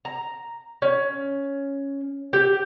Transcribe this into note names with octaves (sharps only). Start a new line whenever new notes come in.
A#5
C#4
G4